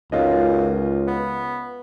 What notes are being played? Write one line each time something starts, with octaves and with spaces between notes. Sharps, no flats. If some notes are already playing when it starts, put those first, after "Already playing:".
C#2 F#2 D#4 F4 D#5
B3